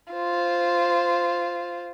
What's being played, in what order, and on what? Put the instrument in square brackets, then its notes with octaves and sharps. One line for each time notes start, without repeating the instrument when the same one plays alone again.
[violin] F4 C5